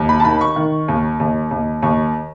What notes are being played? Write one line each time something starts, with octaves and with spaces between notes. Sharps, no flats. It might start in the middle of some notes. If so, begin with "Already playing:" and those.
Already playing: D#2
B5
A5
D#3 B5
C#6
D#3
D#2
D#2
D#2
D#2 C#6